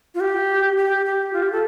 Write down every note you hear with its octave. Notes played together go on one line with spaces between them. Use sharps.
F4
G4
G4
G4
F4
G4
A4